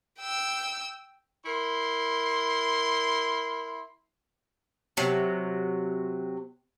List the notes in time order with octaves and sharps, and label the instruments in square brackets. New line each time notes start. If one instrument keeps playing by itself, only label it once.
[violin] G5 E6
[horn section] E4 A#4 C6
[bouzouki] C3 F#3